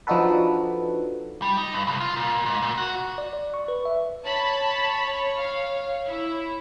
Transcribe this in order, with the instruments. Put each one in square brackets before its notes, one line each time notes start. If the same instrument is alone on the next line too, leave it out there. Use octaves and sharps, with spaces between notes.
[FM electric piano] F3 D4 D#4 F#4 A4 B4
[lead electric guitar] G3
D#4
G2
C2
F4
A#2
G#2
A#2
F#4
[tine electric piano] D5
D5
C#6
B4
E5
[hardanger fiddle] C#5 [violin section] A5 B5
[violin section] F5
E4